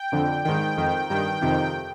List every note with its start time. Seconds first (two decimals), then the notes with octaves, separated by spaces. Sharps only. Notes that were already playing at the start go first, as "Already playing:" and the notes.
Already playing: G5
0.12 F2 D3
0.45 G#2 D#3 G5
0.77 F2 D#3
1.10 G2 D#3 G5
1.41 F2 C3 D#3